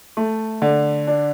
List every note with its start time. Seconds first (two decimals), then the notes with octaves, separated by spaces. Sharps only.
0.17 A3
0.62 D3
1.07 D4